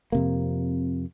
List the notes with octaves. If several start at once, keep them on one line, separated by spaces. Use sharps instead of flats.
F2 C3 A#3